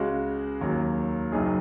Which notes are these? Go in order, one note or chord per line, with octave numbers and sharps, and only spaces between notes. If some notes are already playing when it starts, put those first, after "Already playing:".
Already playing: C#2 C#3 G#3 F#4
D#2 D#3 F#3
F#1 F#2 F#3 D#4 G#4